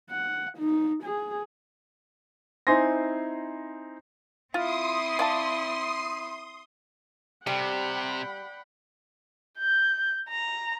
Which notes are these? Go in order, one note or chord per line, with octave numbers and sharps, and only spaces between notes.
F#5
D#4
G#4
C4 D#4 E4 G#5 C6 A#6
C4 E4 F4 C6 D#6
D5 F5 A5
C3 G3 F#5 G5 B5
G6
A#5